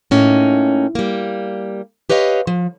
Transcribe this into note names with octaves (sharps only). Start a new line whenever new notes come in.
A2 A#3 C#4 D#4
G3 A#3
G4 B4 C#5 D#5 F5
F3